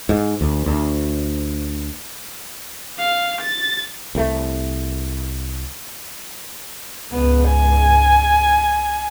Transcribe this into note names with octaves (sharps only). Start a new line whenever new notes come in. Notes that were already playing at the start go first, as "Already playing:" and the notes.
G#2
D2
D2
F5
A6
C2 A3
C#2 G#2 B3
G#5